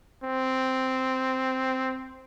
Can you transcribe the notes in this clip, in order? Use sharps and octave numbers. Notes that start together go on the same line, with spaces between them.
C4